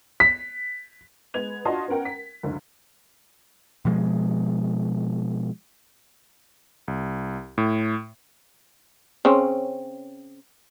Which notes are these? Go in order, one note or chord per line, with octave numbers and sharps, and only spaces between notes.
B6
G#3 B3 G#6 F7
D4 F4 F#4 D#5 A5 C6
B3 C#4 A#4 F#5 G5
B6
F#1 D2
B2 F3 G#3
C2
A2
C#3 C4 C#4